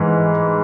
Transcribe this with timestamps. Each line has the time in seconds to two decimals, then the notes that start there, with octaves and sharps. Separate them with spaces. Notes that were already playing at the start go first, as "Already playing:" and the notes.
Already playing: G#2 E3